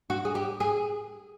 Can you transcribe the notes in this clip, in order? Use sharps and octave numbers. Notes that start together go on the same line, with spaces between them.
F#4
G#4
G4
G#4